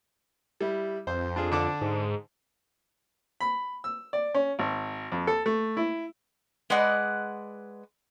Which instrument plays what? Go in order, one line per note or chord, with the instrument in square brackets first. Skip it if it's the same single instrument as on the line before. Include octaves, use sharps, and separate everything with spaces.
[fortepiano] G3 E4
[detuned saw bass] F2 [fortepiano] C5
[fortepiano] D4 F4 G#4
D3 D4 D6
[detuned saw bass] G#2
[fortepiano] B5
E6
D5
C#4
G#1
F2
A4
A3
E4
[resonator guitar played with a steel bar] G#3 B4 D5 D#5 F#5